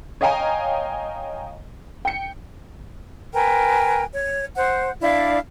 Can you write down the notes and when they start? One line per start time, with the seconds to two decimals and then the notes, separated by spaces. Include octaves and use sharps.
0.21 C#5 D#5 F5 G5 G#5 A#5
2.05 G5 C#7
3.33 A#4 B4 G5 G#5
4.14 C#5
4.56 C5 F#5
5.00 D4 E4 D5 F5